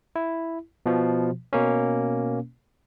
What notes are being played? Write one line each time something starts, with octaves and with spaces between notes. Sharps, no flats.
E4
B2 F3
B2 A#3 C#4